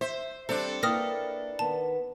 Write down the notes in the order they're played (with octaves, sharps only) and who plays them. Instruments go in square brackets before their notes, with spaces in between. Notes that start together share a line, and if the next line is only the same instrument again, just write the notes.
[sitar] C5 [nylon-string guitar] E5
[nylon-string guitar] G3 C4 [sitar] D4 A4 [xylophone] C5
[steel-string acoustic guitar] A#3 E4 [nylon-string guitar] A#4 B4 G5 [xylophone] D#6 F6 A#6
[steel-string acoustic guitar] D#3 B3 [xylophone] A5